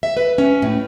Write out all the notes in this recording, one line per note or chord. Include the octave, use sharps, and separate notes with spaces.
E5
B4
C#4
A2